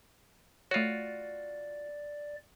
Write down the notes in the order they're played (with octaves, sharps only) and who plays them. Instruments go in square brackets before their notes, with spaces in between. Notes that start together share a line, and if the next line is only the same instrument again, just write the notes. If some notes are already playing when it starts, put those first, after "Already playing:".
[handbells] A3 C#5 [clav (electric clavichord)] F4 F#4 [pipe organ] D5